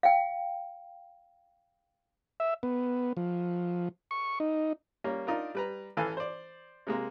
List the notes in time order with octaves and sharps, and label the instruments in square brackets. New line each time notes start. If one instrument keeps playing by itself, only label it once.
[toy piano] F5 G5
[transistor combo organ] E5
B3
F3
C#6
D#4
[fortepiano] G3 A#3 C#4
D4 D#4 F4 A#4
G3 B4 A#5
A1 E3 A4 F5 G#5
C5 D5
C3 G#3 A#3